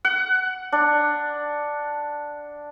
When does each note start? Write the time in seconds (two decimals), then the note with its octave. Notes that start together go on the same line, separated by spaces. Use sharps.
0.05 F#5
0.72 D4